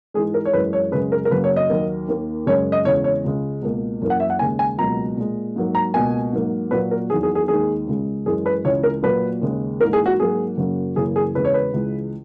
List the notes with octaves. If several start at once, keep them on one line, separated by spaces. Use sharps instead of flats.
G#2 E3 G#3 G#4
A#4
C#5
F#2 E3 G#3 B4
C#5
F#2 C#3 G#3 B4
A#4
A#4
F#2 C#3 F#3 A#3 B4
C#5
D#5
D#2 D#3 F#3 A#3
D#2 D#3 A#3
F#2 C#3 G#3 C#5
D#5
E2 C#3 G#3 C#5
C#5
C#2 C#3 G#3
C#2 B2 A#3
F#2 E3 A#3
F#5
E5
F#5
D#2 C#3 G#3 G#5
G#5
C#2 B2 F#3 A#3 A#5
A#2 G#3
G#2 F#3 A#3
A#5
C#2 B2 A#3 G#5
G#2 F#3 A#3
A#2 F#3 A#3 B4
A#4
E2 D#3 F#3 A#3 G#4
G#4
G#4
D#2 D#3 G#3 G#4
C#2 C#3 G#3
F#2 E3 G#3 G#4
B4
C#2 C#3 E3 G#3 C#5
A#4
A#2 F#3 A#3 B4
D#2 C#3 G#3
G#2 E3 A#3 A#4
G#4
F#4
G#2 F#3 A#3 G#4
F#2 C#3 F#3 A#3
F#2 C#3 E3 A#3 G#4
G#4
E2 C#3 G#3 B4
C#5
B4
C#2 C#3 E3 G#3